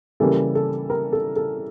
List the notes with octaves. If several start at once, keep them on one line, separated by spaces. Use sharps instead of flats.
C#3 E3 G3 A#3 C#4 A4
A4
A#4
A4
A4